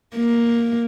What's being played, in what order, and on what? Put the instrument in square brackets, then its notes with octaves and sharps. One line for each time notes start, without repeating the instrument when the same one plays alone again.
[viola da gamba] A#3